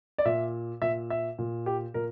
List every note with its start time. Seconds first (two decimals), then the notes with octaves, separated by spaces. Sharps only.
0.18 D5
0.25 A#2 E5
0.82 A#2 E5
1.10 E5
1.39 A#2
1.66 G4
1.94 A#2 A#4